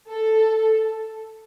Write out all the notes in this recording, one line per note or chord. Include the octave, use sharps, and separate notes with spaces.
A4